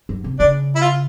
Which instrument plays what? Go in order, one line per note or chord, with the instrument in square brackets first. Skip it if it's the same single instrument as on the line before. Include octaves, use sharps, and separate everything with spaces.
[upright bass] F#2
C3
[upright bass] C#3 [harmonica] D4
[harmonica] E4
F4